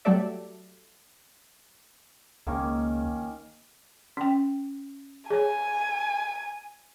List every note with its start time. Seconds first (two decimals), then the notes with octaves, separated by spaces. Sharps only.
0.05 F#3 G3 A3 A4 D5 E5
2.47 C#2 D#3 A#3 C#4
4.17 C#4 G5
5.30 G#4 C#5 G#5